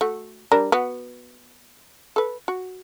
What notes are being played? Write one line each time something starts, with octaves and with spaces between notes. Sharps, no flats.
A3 F#4
G3 D4 A#4
B3 F#4
A4 B4
F#4